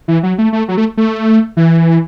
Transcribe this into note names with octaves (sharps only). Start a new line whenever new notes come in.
E3
F#3
A3
A3
F#3
A3
A3
E3